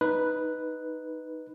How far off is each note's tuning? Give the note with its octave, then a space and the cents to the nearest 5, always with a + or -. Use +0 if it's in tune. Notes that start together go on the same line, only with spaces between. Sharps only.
D#4 +0 B4 +0